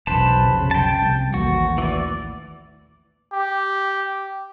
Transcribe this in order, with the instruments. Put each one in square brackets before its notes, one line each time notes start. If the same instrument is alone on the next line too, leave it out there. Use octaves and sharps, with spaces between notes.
[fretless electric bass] E1 B1 [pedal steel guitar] B4 C5 A5
[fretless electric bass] F1 B1 C#3
[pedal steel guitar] G5 A5
[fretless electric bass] C2
[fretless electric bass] A1 D#2 [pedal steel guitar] F#4
[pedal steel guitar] E3 D5
[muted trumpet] G4